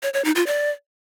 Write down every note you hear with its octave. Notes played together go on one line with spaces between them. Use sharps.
C#5
C#5
D#4
F4
D5